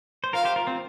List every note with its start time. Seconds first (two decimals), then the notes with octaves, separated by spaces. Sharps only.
0.24 C5
0.33 F4 A#4 F5
0.45 G4 C5
0.56 F4 A#4
0.67 C4 F4